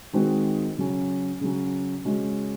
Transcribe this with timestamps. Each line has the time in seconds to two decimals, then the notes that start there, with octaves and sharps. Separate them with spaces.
0.13 D#3 G#3 C4 D#4 F#4
0.78 C#3 F#3 C#4
1.41 C#3 F#3 C#4
2.05 C#3 G#3 C#4 F#4